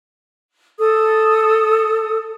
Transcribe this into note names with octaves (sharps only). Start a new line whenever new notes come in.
A4 D#6